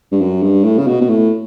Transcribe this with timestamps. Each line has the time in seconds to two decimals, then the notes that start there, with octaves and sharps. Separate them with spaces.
0.12 G2
0.21 F#2
0.42 G2
0.64 A2
0.78 C#3
0.87 B2
1.01 B2
1.09 A2